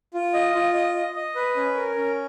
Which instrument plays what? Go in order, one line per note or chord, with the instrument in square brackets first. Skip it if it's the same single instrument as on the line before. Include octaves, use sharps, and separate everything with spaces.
[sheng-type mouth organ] F4
D#5
F4
D#5
D#5
D#5
B4
C#4
A#4
C#4